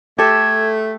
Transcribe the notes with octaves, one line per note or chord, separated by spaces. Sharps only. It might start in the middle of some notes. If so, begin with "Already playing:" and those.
A3 G4 A4 E5 G#6